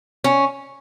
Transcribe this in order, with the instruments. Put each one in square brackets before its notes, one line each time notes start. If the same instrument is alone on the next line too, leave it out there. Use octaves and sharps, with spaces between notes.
[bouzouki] C#4